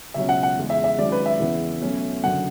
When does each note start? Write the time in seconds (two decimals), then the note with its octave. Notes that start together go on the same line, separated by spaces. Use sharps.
0.14 C#2 B2 F#3 C#4 E5
0.29 F#5
0.43 F#5
0.57 E2 C#3 G#3
0.70 E5
0.84 E5
0.98 G#1 G#2 F#3 C#4 D5
1.12 B4
1.26 E5
1.40 E2 C#3 E3 B3
1.81 B1 B2 A3 C#4
2.23 F#1 F#2 D3 F#5